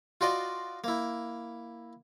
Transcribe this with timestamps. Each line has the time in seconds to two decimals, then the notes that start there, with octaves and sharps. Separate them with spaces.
0.21 F4 F#4 D5 D#5
0.84 A#3 E4